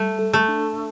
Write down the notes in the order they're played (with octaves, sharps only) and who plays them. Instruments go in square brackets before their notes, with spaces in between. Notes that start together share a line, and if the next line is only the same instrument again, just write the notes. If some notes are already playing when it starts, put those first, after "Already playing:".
Already playing: [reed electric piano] G3 [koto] A3
[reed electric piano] A4
[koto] A3
[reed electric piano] D4